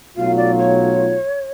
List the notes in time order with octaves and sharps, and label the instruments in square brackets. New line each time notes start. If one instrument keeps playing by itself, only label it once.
[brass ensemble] B1 B2 F#3 A3 F4 [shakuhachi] F5
[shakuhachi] D5
C#5